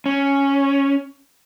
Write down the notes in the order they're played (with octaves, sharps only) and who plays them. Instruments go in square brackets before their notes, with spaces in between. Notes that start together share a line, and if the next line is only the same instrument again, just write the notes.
[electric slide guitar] C#4